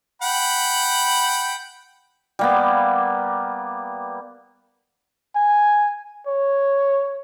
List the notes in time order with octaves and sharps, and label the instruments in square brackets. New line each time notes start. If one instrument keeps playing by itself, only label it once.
[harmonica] F#5 G5 B5
[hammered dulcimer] G3 A#3 B3
[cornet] G#5
C#5